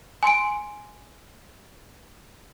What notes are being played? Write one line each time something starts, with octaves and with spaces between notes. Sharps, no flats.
G#5 C6 C#7 D7